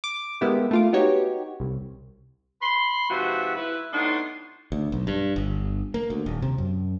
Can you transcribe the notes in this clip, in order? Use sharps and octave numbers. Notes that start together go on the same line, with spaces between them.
D6
G#3 A#3 B3 E4 G4
A3 F4 D6
B3 D#4 F#4 G4 C#5
C2
B5 C6
G#2 C3 F3 F#4 B4 E5
E4 B4
A2 B3 D4 D#4 F#4 C6
D2
B1
G2
G1
A#3
D2
D#1
C3
F#2